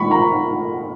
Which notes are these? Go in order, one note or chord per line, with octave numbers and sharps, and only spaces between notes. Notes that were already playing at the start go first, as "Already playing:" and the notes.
Already playing: B5 C#6
A#5